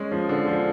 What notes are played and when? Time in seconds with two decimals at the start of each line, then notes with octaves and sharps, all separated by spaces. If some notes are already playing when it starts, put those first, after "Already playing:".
Already playing: G#3 C#4 G#4
0.12 F3
0.29 D3
0.48 F3